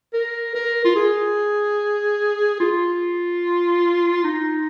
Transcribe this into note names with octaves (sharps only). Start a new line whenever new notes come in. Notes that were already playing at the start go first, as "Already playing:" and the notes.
A#4
A#4
F4
G#4
F4
D#4